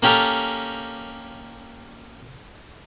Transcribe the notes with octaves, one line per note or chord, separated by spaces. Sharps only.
A#3 C#4 G4 A4 A#4